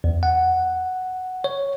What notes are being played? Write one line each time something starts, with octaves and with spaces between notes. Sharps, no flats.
E2
F#5
C#5